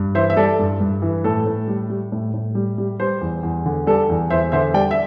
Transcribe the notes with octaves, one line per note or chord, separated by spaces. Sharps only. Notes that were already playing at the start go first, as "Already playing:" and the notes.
Already playing: G2
E3 C5 E5
E5
G3 A4 D5
G2
G2
E3
A2 A4
A2
G3
G3
A2
A2
G3
G3
G3 C5
E2
E2
D3
G3 A4 D5
E2
E2 C5 E5
D3 C5 E5
G3 D5 G5
E5